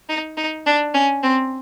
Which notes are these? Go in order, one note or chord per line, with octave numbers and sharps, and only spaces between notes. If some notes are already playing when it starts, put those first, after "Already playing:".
D#4
D#4
D4
C#4
C4